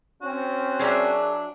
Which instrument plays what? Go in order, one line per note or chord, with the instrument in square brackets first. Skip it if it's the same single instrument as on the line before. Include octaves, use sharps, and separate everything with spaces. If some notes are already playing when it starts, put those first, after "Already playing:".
[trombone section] C4 C#4 [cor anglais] F#4
[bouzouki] F#3 D4 [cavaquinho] G#4 A#4 E5